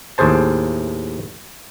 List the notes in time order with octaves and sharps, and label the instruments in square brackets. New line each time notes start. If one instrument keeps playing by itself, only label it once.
[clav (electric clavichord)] D#2 A2 G#4 C5 A5